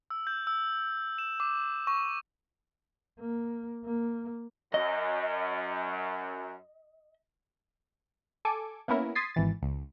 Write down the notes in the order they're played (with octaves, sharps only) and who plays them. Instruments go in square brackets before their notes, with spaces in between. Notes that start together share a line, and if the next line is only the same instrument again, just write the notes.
[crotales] E6
G6
E6
E7
D6
C#6
[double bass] A#3
A#3
[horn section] F#2 [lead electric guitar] D#5
[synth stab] A4 G#5 D6
A#3 B3 C#4 E4 A#4
C6 D#6 G#6 A6 B6 C7
G#1 E3 A6
C#2